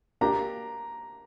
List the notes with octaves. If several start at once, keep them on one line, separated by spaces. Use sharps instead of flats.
A#3 D4 G4 A#5